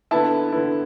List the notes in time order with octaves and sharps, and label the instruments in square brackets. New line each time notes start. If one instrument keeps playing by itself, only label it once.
[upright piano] D3 B3 E4 E5 A5
D3 B3 E4